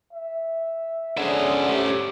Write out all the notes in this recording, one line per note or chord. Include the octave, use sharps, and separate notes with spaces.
E5
D3 C#4 G#4 C5 E5
A3 G4